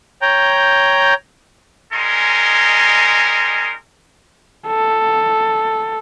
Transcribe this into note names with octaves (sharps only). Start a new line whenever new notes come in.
C#5 G5 A#5 G6
G3 G#3 D#4 A#4 G#5 C6
A4